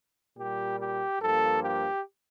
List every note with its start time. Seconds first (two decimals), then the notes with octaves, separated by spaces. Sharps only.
0.37 A#2 G3 A#3 G4
0.79 G4
1.20 G2 F3 A#3 A4
1.63 G4